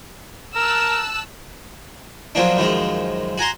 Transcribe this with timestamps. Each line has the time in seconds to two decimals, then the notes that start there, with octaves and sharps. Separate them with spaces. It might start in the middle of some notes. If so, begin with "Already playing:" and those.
0.56 A#4 A5 E6 F#6
2.35 F3 F#3 A#3 C#4 D4
2.57 F#2 D#3 F3 G#3
3.38 F#4 G#5 A#5 C6